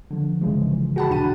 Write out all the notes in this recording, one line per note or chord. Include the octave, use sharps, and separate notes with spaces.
D3 F3
A#1 G#2 C#3 E3 F3 G#3
F#4 G#4 F#5 G5 A5 B5
D#2 A#2 D4 A5 D#7